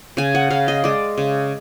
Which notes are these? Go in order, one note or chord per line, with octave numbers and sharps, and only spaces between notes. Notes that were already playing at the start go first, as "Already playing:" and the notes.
C#3 G#5
F#5
C#3 F5
D#5
G#3 D5
C#3